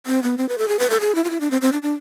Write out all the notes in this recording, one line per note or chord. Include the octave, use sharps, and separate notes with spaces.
C4
B3
C4
B4
A4
G#4
B4
A4
G#4
E4
F4
E4
D4
C4
C4
D4
D4